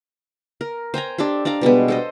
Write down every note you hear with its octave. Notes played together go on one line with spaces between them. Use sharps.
A#4
C5 G5 G#5 A#5
D4 G4 A4 C5
D4 D5 F5 A#5
B2 G3 G#3 B3
A4 C5 D#5